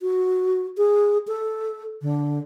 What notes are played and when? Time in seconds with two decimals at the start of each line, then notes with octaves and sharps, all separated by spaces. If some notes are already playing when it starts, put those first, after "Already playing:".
0.01 F#4
0.77 G#4
1.28 A4
2.02 D3